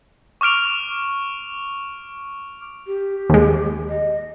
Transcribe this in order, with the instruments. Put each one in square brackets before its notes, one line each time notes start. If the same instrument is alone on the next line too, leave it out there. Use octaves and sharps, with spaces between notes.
[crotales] C#6 D6 F6 D7 F7
[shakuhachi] G4
[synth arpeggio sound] D#2 G#3
[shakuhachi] D#5